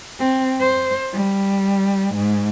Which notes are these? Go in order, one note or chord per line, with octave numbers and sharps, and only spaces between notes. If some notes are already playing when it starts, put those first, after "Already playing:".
C4
C5
G3
G#2